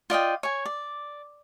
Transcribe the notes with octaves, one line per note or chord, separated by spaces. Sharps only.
F4 D5 D#5 G5
C#5 G#5
D5